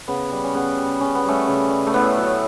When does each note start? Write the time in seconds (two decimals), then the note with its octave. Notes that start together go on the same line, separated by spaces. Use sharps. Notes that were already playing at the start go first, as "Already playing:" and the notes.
0.08 C#3 B3
0.32 G3
0.44 C#4
0.54 C#3 B3
0.77 G3
1.01 C#3 C#4
1.15 B3
1.24 G3 A3 C#4
1.47 C#3
1.70 G3
1.87 A3
1.94 A2 B3
2.17 F#3